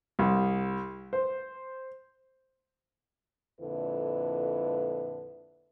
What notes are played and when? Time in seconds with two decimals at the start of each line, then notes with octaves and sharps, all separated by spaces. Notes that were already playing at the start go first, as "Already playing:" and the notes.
0.19 C2
1.13 C5
3.60 F2 A#2 D3 E4 B4